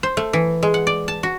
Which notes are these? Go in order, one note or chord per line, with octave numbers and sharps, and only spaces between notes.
C5
A3
E3
G#3
F#5
D5
A5
F#4